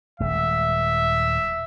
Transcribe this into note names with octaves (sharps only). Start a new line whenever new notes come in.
D#1 G#3 E5